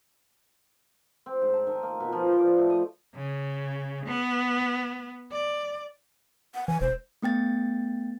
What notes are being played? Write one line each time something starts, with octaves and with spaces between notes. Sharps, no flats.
C4
G#2
A5
D#3
A#3
B2
F3
C5
D5
A3
D#5
C#3
B3
D5
F#5
E3 G#5
E1 C5
A3 B3 G5 A6